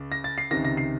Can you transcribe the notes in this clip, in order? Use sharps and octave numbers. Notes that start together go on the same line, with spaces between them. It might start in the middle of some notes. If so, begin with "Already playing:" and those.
Already playing: C#2 C#3
A#6
A6
C7
C#2 C3 D#3 A#6
A#6
C7